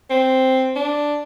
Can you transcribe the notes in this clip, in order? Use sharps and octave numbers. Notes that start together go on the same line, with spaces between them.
C4
D4